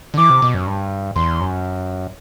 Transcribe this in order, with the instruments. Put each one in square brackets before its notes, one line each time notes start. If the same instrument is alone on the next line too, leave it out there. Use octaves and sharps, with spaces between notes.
[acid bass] D3
[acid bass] E3 [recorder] D6
[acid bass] C3
B2
F#2
G2
[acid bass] E2 [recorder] C6
[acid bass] F#2